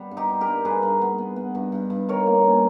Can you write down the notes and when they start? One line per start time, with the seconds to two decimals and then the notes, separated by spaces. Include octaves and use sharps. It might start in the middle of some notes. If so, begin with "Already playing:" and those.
Already playing: G3 B3 B4
0.11 G2
0.17 D#4 G4
0.30 G3
0.41 G4 A#4
0.47 G2
0.65 G2 G#4 B4
0.83 G2
1.02 B3
1.18 B3
1.36 B3
1.55 G2
1.72 G2
1.90 G2
2.09 D#3 A#4 C#5
2.27 A#3
2.44 C#4